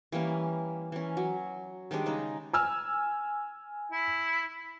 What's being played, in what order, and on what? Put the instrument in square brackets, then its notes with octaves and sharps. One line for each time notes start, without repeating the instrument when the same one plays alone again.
[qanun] E3 G3 A#3 C#4
E3 C#4
F#3
D#3 G3 G#3 D4
C#3 D#4
[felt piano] G#5 E6 F6
[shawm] E4